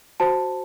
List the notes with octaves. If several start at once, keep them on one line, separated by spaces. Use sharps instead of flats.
F#4 C5 A5